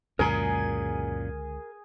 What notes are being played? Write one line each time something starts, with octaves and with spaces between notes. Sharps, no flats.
C#2 F#2 A#2 D3 G#3 G#4 A#4 A#5